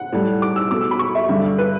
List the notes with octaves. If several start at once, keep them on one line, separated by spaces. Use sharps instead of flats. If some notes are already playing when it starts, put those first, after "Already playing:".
Already playing: F#5
A2 G3
D6
E6
B2 A3 D6
E6
B5
C#6
E5
G2 D3 G3
B4